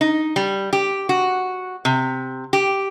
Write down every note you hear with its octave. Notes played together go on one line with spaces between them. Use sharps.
D#4
G3
G4
F#4
C3
G4